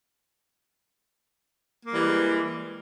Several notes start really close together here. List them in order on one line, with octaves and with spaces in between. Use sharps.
A#3 G3 E3 G#3